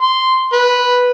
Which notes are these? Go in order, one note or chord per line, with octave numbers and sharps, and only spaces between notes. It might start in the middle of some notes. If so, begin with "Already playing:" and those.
C6
B4